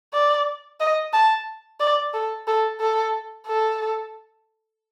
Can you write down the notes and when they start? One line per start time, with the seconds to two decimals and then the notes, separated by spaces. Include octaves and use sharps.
0.14 D5
0.80 D#5
1.13 A5
1.80 D5
2.14 A4
2.47 A4
2.81 A4
3.47 A4